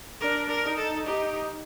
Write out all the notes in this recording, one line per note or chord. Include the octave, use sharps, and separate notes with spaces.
D4 A#4
A#4
D#4
A4
D#4 G4